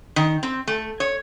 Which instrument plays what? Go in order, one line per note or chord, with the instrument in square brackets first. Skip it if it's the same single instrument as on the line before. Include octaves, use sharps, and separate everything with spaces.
[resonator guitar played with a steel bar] D#3
C4
A3
C#5